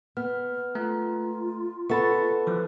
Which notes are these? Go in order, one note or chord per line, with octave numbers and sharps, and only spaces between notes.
B3 F6
A3 F4 A#5
B3 A4 E5 F#5 B5 C#6 A6
E3 F3 B4